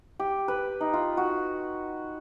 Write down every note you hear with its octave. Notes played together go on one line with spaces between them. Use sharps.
G4
B4
D#4
F4
F#4